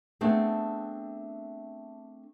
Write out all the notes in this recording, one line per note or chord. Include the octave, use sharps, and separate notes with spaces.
A3 B3 C4 D4 G#4